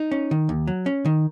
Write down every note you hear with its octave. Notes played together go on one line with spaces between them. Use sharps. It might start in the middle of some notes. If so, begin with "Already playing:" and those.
Already playing: D#4
C#4
D#3
D#2
F#3
C#4
D#3